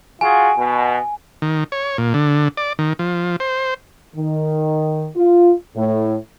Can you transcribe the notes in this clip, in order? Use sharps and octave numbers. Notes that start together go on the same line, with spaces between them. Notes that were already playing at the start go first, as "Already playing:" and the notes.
F4 F#4 G#4 G#5
B2
D#3
C#5
A#2
D3
D5
D#3
F3
C5
D#3
F4
A2